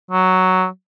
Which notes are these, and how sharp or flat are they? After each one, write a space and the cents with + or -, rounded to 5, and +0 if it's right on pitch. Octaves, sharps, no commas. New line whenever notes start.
F#3 +5